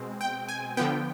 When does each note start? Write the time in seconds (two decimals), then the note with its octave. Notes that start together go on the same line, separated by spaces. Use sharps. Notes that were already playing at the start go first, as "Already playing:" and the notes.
Already playing: B2 G#3 C4
0.21 G5
0.49 G#5
0.77 D3 F3 B3 G5